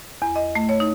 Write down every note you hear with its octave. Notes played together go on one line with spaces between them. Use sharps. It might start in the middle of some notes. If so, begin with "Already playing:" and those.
E2
D#5
A3
C#5
D#4